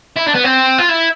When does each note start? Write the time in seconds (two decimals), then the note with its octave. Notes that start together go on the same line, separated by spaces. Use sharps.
0.16 E4
0.26 D4
0.34 B3
0.44 C4
0.78 F4
0.89 E4